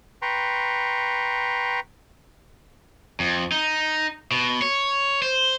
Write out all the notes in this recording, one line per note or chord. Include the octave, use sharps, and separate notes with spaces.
B4 G5 A#5 C6 C#6
F2
D#4
B2
C#5
C5